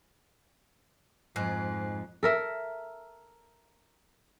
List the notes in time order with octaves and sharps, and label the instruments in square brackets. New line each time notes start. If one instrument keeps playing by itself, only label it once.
[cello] F2 [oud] G#2 [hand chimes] G#5 F#6 C7
[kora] A4 A#4 E5